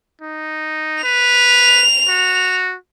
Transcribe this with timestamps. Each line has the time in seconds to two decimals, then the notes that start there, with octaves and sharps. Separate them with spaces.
0.21 D#4
1.03 B4 F7
2.08 F#4